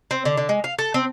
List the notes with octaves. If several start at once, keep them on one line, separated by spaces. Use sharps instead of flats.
C4
D3
D3
G#3
F5
A4
C4